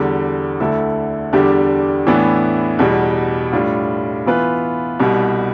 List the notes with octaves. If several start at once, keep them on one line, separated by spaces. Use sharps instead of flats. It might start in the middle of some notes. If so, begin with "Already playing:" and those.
Already playing: E2 D3 G3
D2 D3 A3 E4 A4
E2 D3 G3 D4 G4
A2 E3 B3 D4
E2 B2 G3
A2 G3 D4 F4
E3 B3 F4 B4
C2 B2 G3